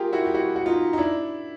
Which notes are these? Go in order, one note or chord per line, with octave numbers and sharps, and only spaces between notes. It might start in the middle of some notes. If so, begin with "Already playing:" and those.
Already playing: F4 G4 G#4 A#4
E4 F#4
G4
E4 F#4
F#4
D#4 F4
D#4
D4 E4